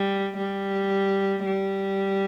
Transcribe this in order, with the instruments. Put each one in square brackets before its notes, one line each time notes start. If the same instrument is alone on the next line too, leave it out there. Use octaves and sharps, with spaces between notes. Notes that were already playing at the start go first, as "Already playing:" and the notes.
Already playing: [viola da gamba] G3
G3
G3